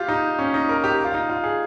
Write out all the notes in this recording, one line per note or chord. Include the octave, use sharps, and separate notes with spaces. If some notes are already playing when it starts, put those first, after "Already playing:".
Already playing: F4 G4
D#4
C#4
D#4
A#4
G4
F4
D#4
F4
G#4